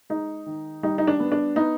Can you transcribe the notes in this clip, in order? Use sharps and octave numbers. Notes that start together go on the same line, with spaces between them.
G#3 D#4
D#3
G3 D#4
D#4
D4
B3
D4
B3 D#4